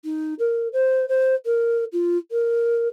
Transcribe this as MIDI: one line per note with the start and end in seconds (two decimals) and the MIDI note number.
0.04 0.34 63
0.39 0.68 70
0.72 1.08 72
1.08 1.34 72
1.45 1.84 70
1.92 2.17 65
2.31 2.88 70